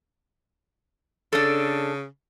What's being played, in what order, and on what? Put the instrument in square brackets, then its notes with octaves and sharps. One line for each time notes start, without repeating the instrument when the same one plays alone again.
[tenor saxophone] C#3 [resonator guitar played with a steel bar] D4 A4